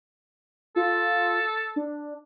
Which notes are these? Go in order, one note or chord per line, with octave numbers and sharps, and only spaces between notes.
F4 A4
D4